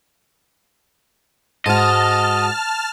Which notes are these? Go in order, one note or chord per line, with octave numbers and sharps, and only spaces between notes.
G#2 F#4 D#5 A5 F6